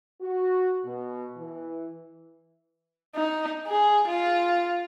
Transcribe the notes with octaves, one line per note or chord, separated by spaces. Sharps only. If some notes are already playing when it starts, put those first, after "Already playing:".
F#4
B2
E3
D#4
G#4
F4